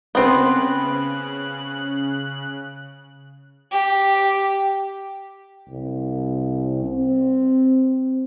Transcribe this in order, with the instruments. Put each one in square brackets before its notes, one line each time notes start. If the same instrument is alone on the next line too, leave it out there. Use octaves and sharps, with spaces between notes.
[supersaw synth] C#3 F#6 [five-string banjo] B3 C4 B4
[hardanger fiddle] G4
[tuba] C2
C4